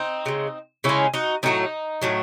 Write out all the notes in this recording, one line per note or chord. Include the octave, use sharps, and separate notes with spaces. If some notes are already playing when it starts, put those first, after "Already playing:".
Already playing: C4 D#4
C#3 G#3
C#3 G#3 C#4 E4
D#4 F#4
A2 F#3 A3 C4 D#4
A2 F#3 A3